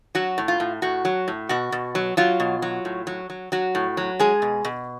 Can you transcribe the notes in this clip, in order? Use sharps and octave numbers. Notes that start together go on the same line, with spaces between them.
F#3 F#4
A2
F4
A2
A2 F#4
F#3
A2
B2 F#4
B2
F#3
F#3 F4
B2
F#3
A2
F#3
F#3
F#3 F#4
A2
F#3
G#3 G#4
B2
B2